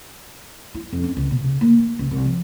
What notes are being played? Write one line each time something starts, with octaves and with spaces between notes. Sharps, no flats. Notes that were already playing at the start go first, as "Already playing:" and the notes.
E4
F2
C#4
C#2
B2
C#3
A#3
D#3
C#2
C2
F3